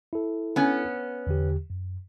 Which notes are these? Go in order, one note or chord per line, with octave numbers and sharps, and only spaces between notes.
E4 A4
B3 C#4
E2 D3 G4
F#2